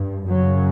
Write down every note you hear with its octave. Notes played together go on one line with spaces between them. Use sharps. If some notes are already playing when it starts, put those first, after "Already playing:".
Already playing: G2
F#2 C#3 F#3